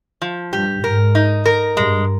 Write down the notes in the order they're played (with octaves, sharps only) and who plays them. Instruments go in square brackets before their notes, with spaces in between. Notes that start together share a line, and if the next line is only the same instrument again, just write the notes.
[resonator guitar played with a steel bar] F3
[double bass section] G2 [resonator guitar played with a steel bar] G4
[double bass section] G#2 [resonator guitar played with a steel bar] A#4
[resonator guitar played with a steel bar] D#4
A#4
[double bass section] G2 [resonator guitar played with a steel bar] G#3